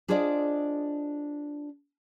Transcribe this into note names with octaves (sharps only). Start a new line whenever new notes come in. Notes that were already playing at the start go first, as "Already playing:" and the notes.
D4 F4 G#4 C5 D5 D#5